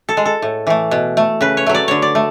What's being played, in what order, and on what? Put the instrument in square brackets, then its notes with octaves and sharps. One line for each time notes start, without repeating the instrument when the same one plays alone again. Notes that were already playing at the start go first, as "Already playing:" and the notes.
[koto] A4
G#3
A4
A2
E3 A3
B2
A3
C#3 B4
C#5
F#3 A3
D5
D3 C#5
D5
A3